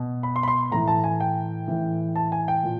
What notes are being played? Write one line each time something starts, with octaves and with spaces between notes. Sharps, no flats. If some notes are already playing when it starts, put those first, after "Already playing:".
Already playing: B2
B5
C6
B5
C6
A2 E3 A#5
A5
G#5
G5
A2 E3
A5
G#5
G5
A#2